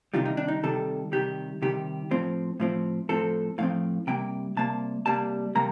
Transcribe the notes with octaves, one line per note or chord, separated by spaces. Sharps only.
C3 D#3 G3 F4
D#4
D4
D#4
C3 D#3 G3 A4
C3 D#3 G3 G4
C3 D#3 G3 G4
A2 F3 C4
A2 F3 C4
A2 F3 C4 A4
A2 F3 C4 F5
C3 G3 A#3 G5
C3 G3 A#3 A5
C3 G3 A#3 A5
C3 G3 A#3 A#5